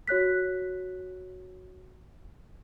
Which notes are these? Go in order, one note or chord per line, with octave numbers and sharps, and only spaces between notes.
F#4 C#5 F#6 B6